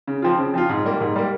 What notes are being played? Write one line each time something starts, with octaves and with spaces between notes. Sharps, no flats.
C#3
F3 C4 F4
C#3
F3 C4 F4
G#2
G3 A#3
G#2
G3 A#3